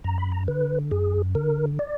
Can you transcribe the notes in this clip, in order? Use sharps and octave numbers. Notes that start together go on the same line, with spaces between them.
F#2 A#5
B5
A#5
D3 B4
F#2 G#4
D3 A#4
D5